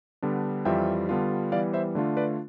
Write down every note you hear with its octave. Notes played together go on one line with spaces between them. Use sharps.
D3 G3 B3 D4
F2 E3 G3 C4 F4 E5 G5
D3 G3 B3 D4 F4
E3 G3 B3 D5 F5
C5 E5
D3 A3 D4 F4
B4 D5